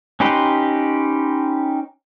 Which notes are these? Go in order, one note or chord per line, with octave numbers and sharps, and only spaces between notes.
C#4 D#4 G4 B4 C5